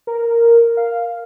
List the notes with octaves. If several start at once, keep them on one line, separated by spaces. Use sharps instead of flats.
A#4
F5